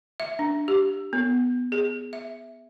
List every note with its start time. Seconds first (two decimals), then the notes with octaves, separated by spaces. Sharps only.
0.20 E5
0.39 D4
0.68 G4
1.13 B3
1.72 G#4
2.13 E5